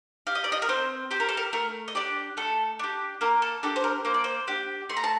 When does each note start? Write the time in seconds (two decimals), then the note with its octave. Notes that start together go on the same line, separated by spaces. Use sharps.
0.27 G4 F5
0.35 D#5
0.44 D5
0.52 D#5
0.62 A#4
0.69 C4 C5
1.11 G4 C5
1.20 A#4
1.29 A4
1.37 A#4
1.53 A3 A#4
1.88 D#5
1.95 D4 G4 D5
2.37 A3 A4
2.79 D4 G4
3.21 A#3 A#4
3.42 A4
3.63 D4 G4 A4
3.76 C5
3.84 A#4
4.05 A#3 C5
4.14 D5
4.24 C5
4.47 D4 G4
4.89 A3 C6
4.97 A#5
5.04 A5